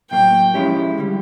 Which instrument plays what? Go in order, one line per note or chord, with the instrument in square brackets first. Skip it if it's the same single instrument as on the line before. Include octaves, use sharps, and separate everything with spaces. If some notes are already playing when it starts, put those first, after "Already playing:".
[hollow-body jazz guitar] A2 F#3 A#3 [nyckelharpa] G5
[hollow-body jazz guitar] F3 G#3 C#4 E4 G4
D3 G3